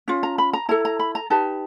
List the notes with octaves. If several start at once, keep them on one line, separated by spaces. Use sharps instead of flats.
C#4 F4
A#5
B5
A#5
E4 A4 A#5
A#5
B5
A#5
D#4 G4 B4 A5